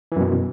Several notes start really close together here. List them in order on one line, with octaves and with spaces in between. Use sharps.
E3 F#2 B2